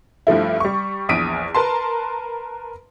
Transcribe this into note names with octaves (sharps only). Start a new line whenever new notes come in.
G2 F3 A3 E4
G3 C#6
A#1 E2 D#6 B6 D7 D#7
A#4 B4 A5 C6